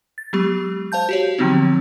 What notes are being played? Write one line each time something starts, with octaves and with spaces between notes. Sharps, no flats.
A6
F#3 G#3 B3 G4
C5 F5 A5 G6
F#4 G4 C#5
D3 F3 F#3 B3 C4 D#4